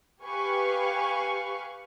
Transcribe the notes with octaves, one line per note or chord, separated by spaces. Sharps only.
G4 B4 F5 G#5 C#6